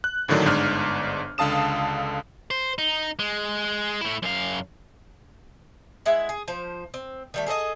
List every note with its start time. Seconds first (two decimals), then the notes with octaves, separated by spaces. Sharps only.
0.04 F#6
0.28 G#1 A2 D3 D#3 F#3 D4
0.46 G1 G#2 D4 F6
1.38 C#2 D3 F5 A5 D#6 E7
2.51 C5
2.78 D#4
3.19 G#3
4.01 A3 E4
4.23 F#2 F5
6.06 G#3 E4 E5 F#5
6.29 G#4
6.48 F3 C5
6.94 C4
7.34 D#3 G3 A3
7.47 G#4 A4 C5 D#5